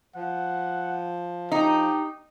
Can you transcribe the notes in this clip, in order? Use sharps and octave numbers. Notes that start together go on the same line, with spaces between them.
F3 F#5
D#4 G4